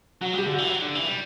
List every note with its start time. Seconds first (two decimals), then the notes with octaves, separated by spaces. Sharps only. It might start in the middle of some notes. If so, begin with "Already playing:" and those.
0.21 F#3 F#4
0.33 G3 G4
0.46 D3 G4
0.53 F#4
0.58 E3
0.71 F#3
0.82 D3
0.95 E3
1.07 G3